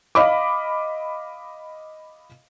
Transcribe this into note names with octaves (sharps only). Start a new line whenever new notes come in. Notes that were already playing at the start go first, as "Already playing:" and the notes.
D#5 F5 B5 D6